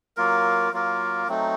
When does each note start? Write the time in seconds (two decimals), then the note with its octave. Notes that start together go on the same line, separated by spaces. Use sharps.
0.17 F#3 A#3 F4 A#4
0.73 F#3 A#3 F4 A#4
1.28 F#3 A3 C4 D#4